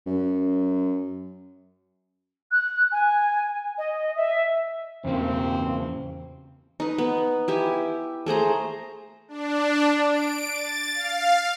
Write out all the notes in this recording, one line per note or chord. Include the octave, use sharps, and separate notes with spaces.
F#2
F#6
G#5
D#5
E5
E2 C#3 A#3 C4
D#4 B4
B3
E4 G4 G#5
A3 G#4 C5 A#5
D4
D7
A6
F5